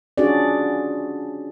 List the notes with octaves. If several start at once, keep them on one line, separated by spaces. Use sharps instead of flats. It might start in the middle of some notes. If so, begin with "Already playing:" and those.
C#4 D4 F4 F#4 G#4 D5